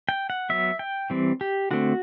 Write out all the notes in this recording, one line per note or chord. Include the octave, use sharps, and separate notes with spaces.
G5
F#5
F#3 B3 E5
G5
E3 G3 C4
G4
D3 A3 C4 F#4